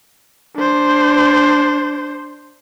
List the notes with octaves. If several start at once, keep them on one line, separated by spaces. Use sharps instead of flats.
D4 C5